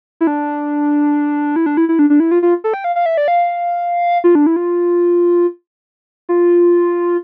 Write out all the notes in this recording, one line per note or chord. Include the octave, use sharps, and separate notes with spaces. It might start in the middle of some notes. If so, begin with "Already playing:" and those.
E4
D4
E4
D4
E4
E4
D4
D4
E4
F4
F4
A4
G5
F5
F5
E5
D5
F5
F4
D4
E4
F4
F4